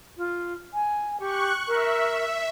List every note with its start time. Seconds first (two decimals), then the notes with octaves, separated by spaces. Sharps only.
0.17 F4
0.73 G#5
1.20 G4 C#6 F#6
1.68 A#4 E5